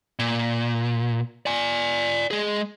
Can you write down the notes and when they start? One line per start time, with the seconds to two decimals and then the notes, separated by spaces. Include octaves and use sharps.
0.19 A#2
1.46 D5 G#5
2.31 G#3 G#4